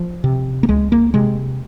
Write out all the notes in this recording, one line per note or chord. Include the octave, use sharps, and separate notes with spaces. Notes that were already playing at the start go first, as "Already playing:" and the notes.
Already playing: F3
C3
A#3
C#2 G#3
A#3
C3 G#3